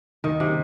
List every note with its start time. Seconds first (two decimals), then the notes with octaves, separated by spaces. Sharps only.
0.24 D#2 D#3
0.40 C3
0.48 C#3 G3 A#3